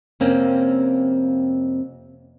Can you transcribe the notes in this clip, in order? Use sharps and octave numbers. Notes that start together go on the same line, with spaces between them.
F2 C3 A#3 C4 C#4